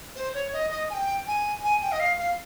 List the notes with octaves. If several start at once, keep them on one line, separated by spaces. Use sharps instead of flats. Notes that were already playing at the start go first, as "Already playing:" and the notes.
C5
C#5
D#5
D#5
G#5
G5
G#5
G#5
G5
D#5
F5
F5